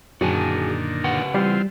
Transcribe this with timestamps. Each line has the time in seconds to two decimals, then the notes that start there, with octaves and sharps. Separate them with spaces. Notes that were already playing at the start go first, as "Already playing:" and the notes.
0.21 F#2 A#2 D3 D#3 F#4 G#4 A5
1.04 C#3 B4 F#5
1.34 E3 G3 C4 F4